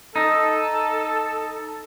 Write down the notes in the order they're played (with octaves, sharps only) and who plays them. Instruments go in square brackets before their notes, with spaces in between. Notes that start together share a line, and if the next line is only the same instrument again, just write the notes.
[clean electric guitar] D#4 [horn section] A4